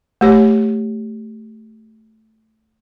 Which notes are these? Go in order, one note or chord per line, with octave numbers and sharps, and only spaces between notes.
A3 G4 C#5